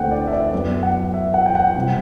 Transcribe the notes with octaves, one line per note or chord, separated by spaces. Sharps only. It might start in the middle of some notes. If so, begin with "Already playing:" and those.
Already playing: D2 D3 A3 C4 F#5 G5
D5
E5
D5
F#2 F#3 B3 D5
F#5
E5
F#5
G5
F#5
C3 G3